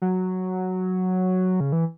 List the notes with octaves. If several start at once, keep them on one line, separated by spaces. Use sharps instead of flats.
F#3
C#3
E3